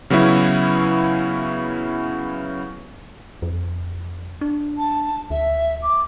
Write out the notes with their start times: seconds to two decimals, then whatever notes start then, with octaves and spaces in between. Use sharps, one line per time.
0.10 C#3 F#3 B3 C#4 E4
3.42 F2
4.41 D4
4.78 A5
5.30 D2 E5
5.83 D6